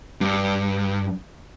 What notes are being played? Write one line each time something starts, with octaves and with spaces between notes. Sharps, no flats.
G2